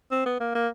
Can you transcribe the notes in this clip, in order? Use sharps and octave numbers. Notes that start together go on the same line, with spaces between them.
C4
B3
A#3
A#3